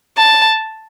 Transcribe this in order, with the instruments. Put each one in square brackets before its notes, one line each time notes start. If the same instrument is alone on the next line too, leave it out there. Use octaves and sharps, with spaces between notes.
[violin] A5